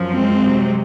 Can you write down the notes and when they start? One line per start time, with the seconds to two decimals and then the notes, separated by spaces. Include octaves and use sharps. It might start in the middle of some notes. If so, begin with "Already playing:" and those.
Already playing: F#2 F3
0.13 G#3 C4
0.44 C3 F#3